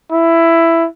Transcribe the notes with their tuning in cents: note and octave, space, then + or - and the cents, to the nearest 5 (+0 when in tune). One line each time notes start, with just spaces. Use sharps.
E4 +10